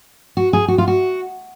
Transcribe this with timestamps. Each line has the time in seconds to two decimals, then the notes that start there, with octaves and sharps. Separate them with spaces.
0.37 F#4
0.53 G#4
0.68 F#4
0.78 F4
0.88 F#4